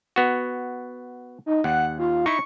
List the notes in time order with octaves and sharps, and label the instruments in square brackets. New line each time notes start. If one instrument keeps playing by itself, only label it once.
[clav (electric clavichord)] B3 F#4
[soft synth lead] D#4
[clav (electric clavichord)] D#2 [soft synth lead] F#5
[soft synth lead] F4
[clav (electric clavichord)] D#4 E4 [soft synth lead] C#6